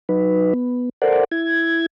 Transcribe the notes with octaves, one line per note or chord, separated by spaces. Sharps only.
F#3 D#4 B4
B3
A4 A#4 C5 D5 F#5
E4 G#6